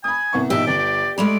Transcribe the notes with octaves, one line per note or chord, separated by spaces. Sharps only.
G#5 B5 D#6
C2 B3 C#6
A#1 B2 D#4 G4 E5
G1 D5 F#7
G#3 A3 D5 B5 F7